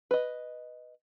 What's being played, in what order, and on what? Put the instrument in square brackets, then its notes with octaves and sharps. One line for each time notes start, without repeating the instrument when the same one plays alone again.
[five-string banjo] B4 D#5